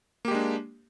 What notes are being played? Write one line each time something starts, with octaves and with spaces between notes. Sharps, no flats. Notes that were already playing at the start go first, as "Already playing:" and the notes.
G#3 A#3 D4 G4